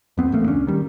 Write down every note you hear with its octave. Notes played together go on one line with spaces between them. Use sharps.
F2 B3 C4
A1 E2 A3 A#3
C#2 C#4 D4
D#3 G3